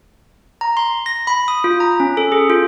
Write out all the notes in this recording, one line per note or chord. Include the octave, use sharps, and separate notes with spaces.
A#5
C6
A#6
B5
D#6
F4
A#5
C#4
A4
G#4
F4